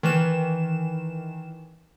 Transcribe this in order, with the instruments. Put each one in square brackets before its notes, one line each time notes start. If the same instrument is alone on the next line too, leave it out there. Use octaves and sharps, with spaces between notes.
[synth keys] D#3 E3 E7